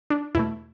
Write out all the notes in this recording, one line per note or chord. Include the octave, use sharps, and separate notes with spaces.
D4
E2 B2 A3 E4